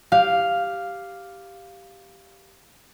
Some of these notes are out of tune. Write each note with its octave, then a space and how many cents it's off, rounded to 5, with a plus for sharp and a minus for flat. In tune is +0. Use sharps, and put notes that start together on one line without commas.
G4 +0 F5 +0